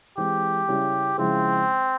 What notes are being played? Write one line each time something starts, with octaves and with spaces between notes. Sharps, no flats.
E3 G#3 C4 G4
C#3 G3 C#4 E4
C#3 F3 G#3 C4 E4